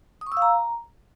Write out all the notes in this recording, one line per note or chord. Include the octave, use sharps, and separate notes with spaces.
D#6
C#6
E6
F5
A#5